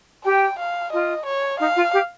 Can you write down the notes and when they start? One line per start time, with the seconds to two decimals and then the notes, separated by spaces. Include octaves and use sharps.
0.25 G4 G5
0.58 F5
0.92 F4 D#5
1.26 C#5
1.59 D#4 F5
1.76 F4
1.93 G4